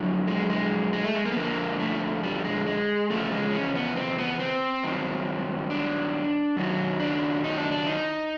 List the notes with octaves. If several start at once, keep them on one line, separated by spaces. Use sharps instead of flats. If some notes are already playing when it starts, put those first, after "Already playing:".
Already playing: F2 D3 F#3
G#3
G#3
G#3
A3
G#3
A#3
B3
F2 D3 F3 A#3
A3
G3
G#3
G#3
E2 C#3 F3 A3
G#3
C#4
B3
C4
B3
C4
G2 D#3 F#3
D4
F#2 D#3 F#3
D4
D#4
D4
D4
D#4